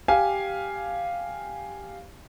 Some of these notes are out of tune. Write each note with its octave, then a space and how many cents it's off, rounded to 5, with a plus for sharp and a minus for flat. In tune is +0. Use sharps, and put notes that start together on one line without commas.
G4 +0 F5 +0 G#5 +0